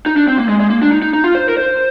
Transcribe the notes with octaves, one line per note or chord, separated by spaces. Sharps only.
D#4
D4
C4
A#3
G#3
G#3
A#3
D4
D#4
D#4
D#4
F4
C5
A#4
C5